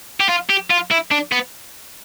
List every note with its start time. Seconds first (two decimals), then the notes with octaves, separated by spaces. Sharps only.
0.20 G4
0.29 F4
0.49 G4
0.70 F4
0.91 E4
1.11 D4
1.32 B3